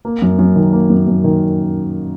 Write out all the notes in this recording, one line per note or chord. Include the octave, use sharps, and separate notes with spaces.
A#3
F#2
F#2
D#3
A#3
F#2
F#2
D#3